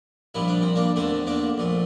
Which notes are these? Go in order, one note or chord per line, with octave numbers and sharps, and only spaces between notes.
A#1 A#2 G3 E4
D4
C4
A#3 D4
E2 D3 A3 C4
A#3 D4
A#1 A#2 A3